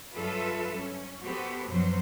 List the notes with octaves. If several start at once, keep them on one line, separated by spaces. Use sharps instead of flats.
G2 F#3 F4 A4 B4 E5
C#4
B3 F#4 G4 A4 C5
F#2 B2 F3 F#3 B3 C5